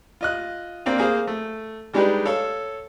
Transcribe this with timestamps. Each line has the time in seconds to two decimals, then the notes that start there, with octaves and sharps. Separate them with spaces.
0.21 F4 D#5 F#6
0.86 A#3 C4 D4 F5
0.98 A#3 G#4 C5 F5
1.27 A3
1.93 G3 G#3 D4 D#4 G4 B4
2.25 A4 C#5 F5 E6